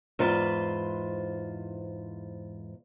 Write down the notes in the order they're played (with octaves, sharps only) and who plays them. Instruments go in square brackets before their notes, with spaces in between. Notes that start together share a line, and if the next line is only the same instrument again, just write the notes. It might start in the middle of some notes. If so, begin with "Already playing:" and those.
[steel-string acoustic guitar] E2 G#2 F4 B4 C5